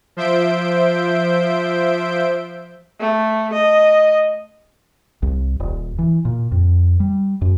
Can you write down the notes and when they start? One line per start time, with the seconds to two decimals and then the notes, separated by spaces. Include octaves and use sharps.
0.17 F3 C5 E5 G6 D7
3.00 A3
3.53 D#5
5.22 C2
5.60 D#1
5.99 E3
6.25 A#2
6.52 F2
7.00 G3
7.41 F#2